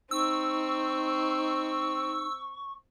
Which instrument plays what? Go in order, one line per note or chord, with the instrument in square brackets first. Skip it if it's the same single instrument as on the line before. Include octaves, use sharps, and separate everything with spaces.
[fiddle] C4 [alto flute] D#4 [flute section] C#6 [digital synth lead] E6